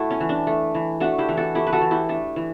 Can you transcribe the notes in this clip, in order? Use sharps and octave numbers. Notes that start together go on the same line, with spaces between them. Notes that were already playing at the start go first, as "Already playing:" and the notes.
Already playing: A3 E4 F#4
C#4
E3
D4
A3
E3
A3 D4 F#4
E4 G4
E3
F#4 A4
A3 E4 G4
B4
F#4 A4
E3
E4 G4
A3 D4
E3